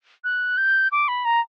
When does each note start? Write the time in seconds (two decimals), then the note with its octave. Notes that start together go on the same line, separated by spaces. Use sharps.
0.24 F#6
0.57 G6
0.92 D6
1.08 B5
1.25 A#5